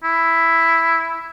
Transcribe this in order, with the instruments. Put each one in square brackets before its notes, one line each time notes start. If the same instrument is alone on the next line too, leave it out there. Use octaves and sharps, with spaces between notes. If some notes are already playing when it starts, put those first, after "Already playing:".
[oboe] E4